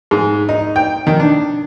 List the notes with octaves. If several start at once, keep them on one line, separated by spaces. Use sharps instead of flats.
G#2
D#4
G5
D#3
D4